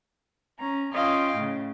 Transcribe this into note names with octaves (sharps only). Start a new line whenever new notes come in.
C#4 A#5
C#4 F4 D#5 F5 G5
A2 C#3